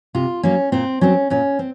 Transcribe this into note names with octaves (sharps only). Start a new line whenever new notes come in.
C3 F4
F#3 A#3 C#4
A#2 C4
F#3 C4 C#4
A#2 C#4
C4